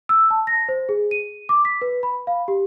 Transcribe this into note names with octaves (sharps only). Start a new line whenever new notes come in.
E6
A5
A#6
C5
G#4
D#7
D6
B6
B4
B5
F5
G4